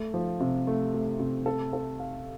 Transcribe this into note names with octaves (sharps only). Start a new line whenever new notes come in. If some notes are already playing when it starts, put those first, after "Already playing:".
Already playing: A3
F3
C3
A3
A3
C3
A4
A4
F5